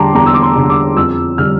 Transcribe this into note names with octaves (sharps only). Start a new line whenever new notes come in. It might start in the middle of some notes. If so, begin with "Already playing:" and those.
Already playing: E2 D3 G3 G5 A5 A#5 C6 D6
E2 A#5
E6
D6
C6
D3 G3
D6
F2 E6
D3 G3 D4 F6